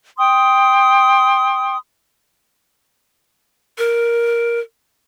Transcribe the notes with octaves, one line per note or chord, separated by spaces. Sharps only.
G5 C6 D#6
A#4